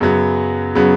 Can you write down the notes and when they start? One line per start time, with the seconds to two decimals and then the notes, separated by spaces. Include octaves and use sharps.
0.01 F#2 C#3 F#3 B3
0.75 C#3 F#3 B3